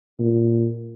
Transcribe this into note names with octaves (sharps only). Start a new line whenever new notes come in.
A#2